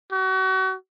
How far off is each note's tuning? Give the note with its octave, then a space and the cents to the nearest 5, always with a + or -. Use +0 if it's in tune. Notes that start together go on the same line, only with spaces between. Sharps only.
F#4 +35